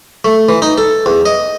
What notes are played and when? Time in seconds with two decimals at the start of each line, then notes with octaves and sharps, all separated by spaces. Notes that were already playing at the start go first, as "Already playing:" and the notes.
0.25 A3
0.49 E3
0.62 D#4
0.78 A4
1.06 E2
1.26 D#5